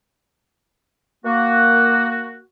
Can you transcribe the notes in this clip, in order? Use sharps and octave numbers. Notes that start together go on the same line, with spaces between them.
A#3 F#4